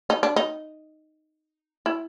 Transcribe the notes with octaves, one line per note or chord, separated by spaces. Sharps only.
D#4
D4
D#4
E4